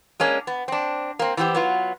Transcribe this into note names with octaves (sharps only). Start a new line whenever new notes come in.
G#3 A#3 C#4 D4
B3
C4 D4
A#3 C4
E3 B3 C4 F4 G4
F#3 B3 F4